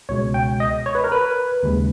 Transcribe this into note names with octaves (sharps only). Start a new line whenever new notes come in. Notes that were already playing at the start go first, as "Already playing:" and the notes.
C#2 B2 G#3 C#5
G5
D#5
C#5
B4
A#4
B4
D#2 C#3 G#3